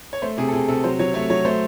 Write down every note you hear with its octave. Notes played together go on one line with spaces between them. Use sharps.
C#5
A3 C5
C3 G#4
A4
C3 G#4
C3 A4
F#3 C5
F#3 C#5
A3 C#5
F#3 C#5
A3 C5